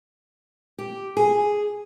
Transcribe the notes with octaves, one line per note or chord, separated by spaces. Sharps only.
G4
G#4